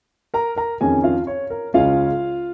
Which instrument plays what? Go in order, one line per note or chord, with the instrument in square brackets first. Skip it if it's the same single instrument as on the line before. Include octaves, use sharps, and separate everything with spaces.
[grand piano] A#4 A#5
A#4 A#5
F2 D#3 C#4 G#4 G#5
F4 F5
C#5
A#4
C#2 C#3 G#3 C#4 F4 F5